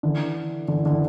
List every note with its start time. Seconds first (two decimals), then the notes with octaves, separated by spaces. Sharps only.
0.03 D3 E3
0.68 D3 E3
0.86 D3 E3